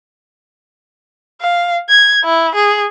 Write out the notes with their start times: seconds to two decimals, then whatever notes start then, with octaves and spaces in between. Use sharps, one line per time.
1.41 F5
1.89 G#6
2.24 E4
2.55 G#4